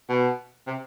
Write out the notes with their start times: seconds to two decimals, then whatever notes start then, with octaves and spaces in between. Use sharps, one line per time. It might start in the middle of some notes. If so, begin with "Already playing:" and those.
0.09 B2
0.67 C3